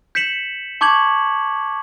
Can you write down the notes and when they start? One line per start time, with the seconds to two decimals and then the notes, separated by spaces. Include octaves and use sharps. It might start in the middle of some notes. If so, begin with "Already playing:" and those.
0.15 G6 B6 C#7 E7 F#7
0.81 A5 C#6 D6 G6 G#6 F#7